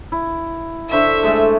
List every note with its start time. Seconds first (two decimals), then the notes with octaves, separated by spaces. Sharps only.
0.12 E4
0.93 D3 C5 E5 C#6
1.23 G#3 A3